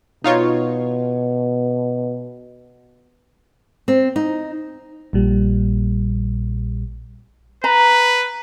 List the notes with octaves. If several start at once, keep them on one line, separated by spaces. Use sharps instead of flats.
B2 D#4 F4 C#5
C4
D#4
A#1 A#2 G3
B4 A#5